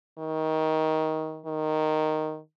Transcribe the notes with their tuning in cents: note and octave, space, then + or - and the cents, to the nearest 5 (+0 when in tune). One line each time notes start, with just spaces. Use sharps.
D#3 +20
D#3 -5